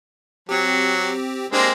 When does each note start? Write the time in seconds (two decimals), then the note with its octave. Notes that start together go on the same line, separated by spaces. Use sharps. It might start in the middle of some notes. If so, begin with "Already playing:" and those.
0.49 F#3 C4 G4
1.52 G#3 A#3 C4 D4 G4